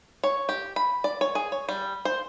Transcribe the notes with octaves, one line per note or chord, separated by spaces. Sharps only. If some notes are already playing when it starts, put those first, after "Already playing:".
C#5
G4
B5
D5
C#5
G#4
C#5
G3
C5